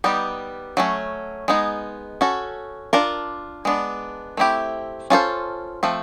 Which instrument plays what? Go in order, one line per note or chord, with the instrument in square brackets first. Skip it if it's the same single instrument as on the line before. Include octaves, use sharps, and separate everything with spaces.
[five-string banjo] G3 B3 D#4 G4
F#3 A3 C#4
G#3 B3 D#4 G#4
C#4 F#4 A4
D4 F4 A#4
G#3 B3 D4
A3 C4 E4 G4
C#4 F4 A4 C5
F3 A3 C4